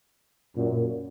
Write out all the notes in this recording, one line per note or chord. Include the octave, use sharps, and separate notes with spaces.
F#2 A#2